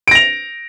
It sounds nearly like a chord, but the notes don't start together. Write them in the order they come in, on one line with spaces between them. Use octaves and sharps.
D7 A#6 F7